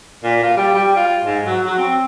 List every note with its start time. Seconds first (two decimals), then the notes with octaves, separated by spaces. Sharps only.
0.24 A#2
0.43 F4
0.56 G3
0.74 G3
0.96 F4
1.24 G#2
1.46 F#3
1.66 F#3
1.78 C4